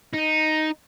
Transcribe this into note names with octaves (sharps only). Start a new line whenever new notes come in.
D#4